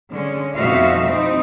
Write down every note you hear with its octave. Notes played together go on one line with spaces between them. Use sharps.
D3 G#3 C#4
F2 B2 D#4 F#4 E5 F5
C4 D#4 E4